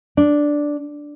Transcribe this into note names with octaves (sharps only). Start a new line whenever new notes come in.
D4